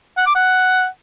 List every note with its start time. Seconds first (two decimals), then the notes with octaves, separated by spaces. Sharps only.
0.18 F#5
0.26 D6
0.35 F#5